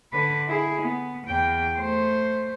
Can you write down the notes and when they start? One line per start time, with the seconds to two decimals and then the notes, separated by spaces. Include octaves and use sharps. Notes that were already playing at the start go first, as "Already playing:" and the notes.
0.13 D3 B4
0.48 E4 G#4
0.82 B3
1.27 E2 G5
1.77 A3 C5